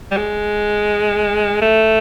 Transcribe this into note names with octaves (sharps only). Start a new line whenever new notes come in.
G3
G#3
A3